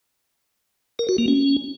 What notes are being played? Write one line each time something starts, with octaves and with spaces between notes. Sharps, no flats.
A#4
F#4
A#3
C#4